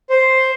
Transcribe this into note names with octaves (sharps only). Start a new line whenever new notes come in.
C5